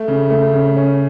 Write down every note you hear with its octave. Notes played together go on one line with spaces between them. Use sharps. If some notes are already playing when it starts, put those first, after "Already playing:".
Already playing: A3
C#3
A3
C#3
C#4